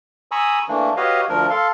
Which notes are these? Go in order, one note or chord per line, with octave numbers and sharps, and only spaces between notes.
G#5 A#5 B5 C#6 D#6 E6
E3 A3 A#3 D4
F#4 G4 B4 C#5 D#5 F5
D2 F3 D4 A#4
A4 F5 C6